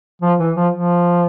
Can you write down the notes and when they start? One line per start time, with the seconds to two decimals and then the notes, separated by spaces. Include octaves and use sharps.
0.22 F3
0.39 E3
0.56 F3
0.73 F3